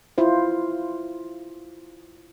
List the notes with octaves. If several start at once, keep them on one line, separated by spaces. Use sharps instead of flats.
E4 F4 C5